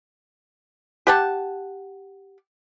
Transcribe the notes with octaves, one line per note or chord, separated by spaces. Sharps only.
G4 F#5 A5